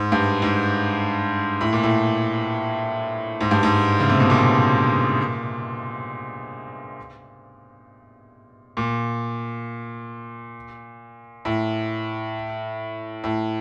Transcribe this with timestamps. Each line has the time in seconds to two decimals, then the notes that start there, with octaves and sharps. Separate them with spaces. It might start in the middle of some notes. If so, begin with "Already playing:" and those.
Already playing: G#2
0.12 G2
0.42 G#2
1.61 A2
1.73 A#2
1.83 A2
3.41 G#2
3.51 G2
3.63 G#2
4.00 C#3
4.10 C3
4.20 B2
4.30 A#2
8.77 A#2
11.45 A2
13.24 A2